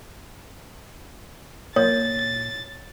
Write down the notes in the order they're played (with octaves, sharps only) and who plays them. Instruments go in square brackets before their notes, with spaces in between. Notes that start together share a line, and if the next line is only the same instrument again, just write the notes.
[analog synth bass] A#2 [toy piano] C#5 [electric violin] A6